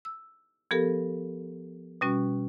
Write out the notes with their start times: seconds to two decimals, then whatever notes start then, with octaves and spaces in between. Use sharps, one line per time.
0.05 E6
0.71 F3 B3 G4 A4 A#4
2.01 B2 G3 C#4 F#4